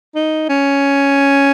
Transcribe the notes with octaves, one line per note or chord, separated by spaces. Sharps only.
D#4
C#4